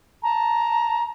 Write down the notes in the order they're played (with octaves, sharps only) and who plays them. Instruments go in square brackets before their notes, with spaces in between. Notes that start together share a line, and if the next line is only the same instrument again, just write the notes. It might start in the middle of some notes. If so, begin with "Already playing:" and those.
[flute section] A5 A#5